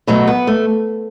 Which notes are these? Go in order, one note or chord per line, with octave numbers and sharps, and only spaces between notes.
B2 F#3 A3
B3
A3